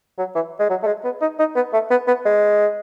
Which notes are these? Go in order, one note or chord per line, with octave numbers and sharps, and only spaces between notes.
F#3
E3
G#3
F#3
A3
G#3
B3
D#4
D#4
B3
A3
B3
B3
G#3